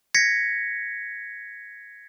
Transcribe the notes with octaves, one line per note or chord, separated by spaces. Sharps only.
G#6 A#6 B6 C#7